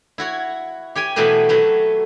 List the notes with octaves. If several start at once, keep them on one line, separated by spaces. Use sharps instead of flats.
E4 F#4 C#5
G4 C#5 G5 G#5
B2 E3 F#3 A3 G4 B4
F#3 A3 B4